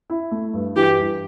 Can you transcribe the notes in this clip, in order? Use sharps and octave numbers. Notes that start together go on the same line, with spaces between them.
E4
A3
G2
E3 G4
G2